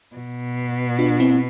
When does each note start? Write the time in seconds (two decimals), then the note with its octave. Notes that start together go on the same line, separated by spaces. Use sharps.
0.16 B2
0.99 D4 F4
1.20 C4 E4